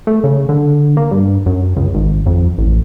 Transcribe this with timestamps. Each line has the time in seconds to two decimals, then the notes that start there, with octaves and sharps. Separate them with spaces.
0.07 A3
0.24 C#3
0.49 D3
0.97 A#3
1.11 G2
1.46 F#2
1.77 C#2
1.95 G#1
2.26 F2
2.58 A1